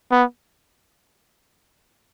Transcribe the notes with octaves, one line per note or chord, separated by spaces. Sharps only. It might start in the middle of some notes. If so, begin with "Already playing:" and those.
B3